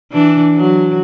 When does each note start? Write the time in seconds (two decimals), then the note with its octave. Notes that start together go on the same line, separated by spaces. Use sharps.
0.12 E3 D4
0.56 F#3